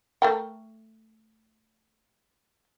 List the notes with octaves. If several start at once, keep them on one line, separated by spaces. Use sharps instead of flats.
A3 A#4 G5